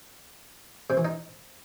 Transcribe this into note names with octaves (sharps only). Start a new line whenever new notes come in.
C3
E3
D#4